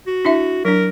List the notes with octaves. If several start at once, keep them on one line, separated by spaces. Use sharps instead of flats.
F#4
D4 E4 E5
F#3 D4 A#4